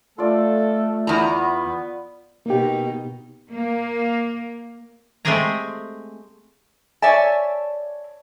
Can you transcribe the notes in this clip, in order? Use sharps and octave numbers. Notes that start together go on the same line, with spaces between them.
A3 F4 A4 D5
E2 B3 A#5
B2 A#3 D#4 G4
A#3
G#3 A3 C4 G4 G#4 A#5
C#5 D5 E5 G#5 A5